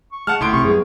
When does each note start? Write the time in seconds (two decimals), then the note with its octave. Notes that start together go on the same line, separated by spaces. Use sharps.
0.12 C#6
0.27 G#3 F#5 A5 F6
0.41 C#2 A2 C6 D7
0.53 A#1 C3 C#6
0.64 F#2 G3 B3 G#4